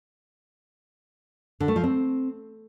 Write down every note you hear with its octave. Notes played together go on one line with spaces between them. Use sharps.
D3
A3
F3
C4